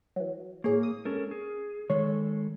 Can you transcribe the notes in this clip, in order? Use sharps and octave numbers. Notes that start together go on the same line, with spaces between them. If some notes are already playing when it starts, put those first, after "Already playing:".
E3 F#3
A2 A#3 G#4 C#5
D#6
G#2 C#4 A4 A#4
G#4
D#3 G#3 A4 C#5